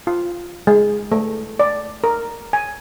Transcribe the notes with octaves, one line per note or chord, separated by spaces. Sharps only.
F4
G#3
A3
D5
A#4
G#5